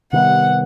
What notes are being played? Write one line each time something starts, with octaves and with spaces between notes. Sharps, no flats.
C3 D#3 G3 B3 F#5